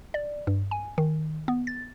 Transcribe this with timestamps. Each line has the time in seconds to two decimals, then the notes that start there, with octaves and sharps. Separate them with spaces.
0.14 D5
0.47 G2
0.71 G#5
0.98 D#3
1.48 B3
1.67 A6